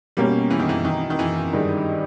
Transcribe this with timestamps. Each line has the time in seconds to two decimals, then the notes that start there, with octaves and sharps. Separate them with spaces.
0.17 B2 G3 A#3 C#4
0.50 E3
0.59 D#3
0.69 E3
0.85 D#3
1.10 D#3
1.19 E3
1.53 G2 D#3 G#3 D#4